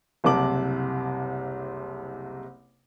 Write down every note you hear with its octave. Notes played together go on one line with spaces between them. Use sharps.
F#1 C2 C3 A5 D6 F#7